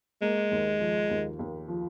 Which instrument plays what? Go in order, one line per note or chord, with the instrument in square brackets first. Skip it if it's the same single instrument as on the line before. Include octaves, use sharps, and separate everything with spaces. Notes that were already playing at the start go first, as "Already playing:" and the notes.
[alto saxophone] G#3 [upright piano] A#3
[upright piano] D#2
F3
D#2
D#2
F3